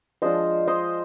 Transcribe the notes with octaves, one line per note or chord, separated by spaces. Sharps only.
F3 G#3 D4 F4 C5 D#5
C5 D#5